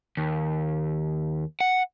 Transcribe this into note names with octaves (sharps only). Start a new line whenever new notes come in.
D#2
F#5